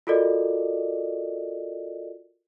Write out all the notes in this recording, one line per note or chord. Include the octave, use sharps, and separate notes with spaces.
F4 F#4 A4 A#4 D5 D#5